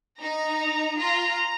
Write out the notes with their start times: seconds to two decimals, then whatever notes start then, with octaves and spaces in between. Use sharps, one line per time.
0.19 D#4 A#5
0.98 F4 A#5